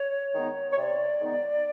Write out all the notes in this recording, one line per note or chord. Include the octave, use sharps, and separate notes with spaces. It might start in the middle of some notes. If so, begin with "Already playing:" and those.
Already playing: C#5
D#3 G#3 B3 D#4
C#5
C3 D5
D#3 G#3 B3 D#4